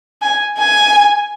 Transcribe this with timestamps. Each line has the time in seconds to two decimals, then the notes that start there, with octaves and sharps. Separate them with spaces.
0.22 G#5
0.58 G#5